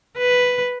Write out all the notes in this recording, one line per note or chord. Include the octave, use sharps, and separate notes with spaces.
B4